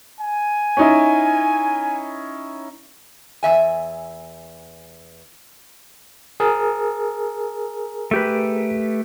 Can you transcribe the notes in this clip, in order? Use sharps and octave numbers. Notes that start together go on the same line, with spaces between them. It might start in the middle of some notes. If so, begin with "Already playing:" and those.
G#5
C#4 D#4 E4
E2 E5 G#5
G#4 A#4
A3 G4 B4